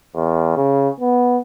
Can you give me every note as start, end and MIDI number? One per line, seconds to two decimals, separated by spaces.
0.15 0.53 40
0.57 0.89 49
1.00 1.37 59